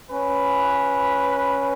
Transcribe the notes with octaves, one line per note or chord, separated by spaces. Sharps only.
C#4 B4